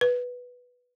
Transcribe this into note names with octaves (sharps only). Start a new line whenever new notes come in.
B4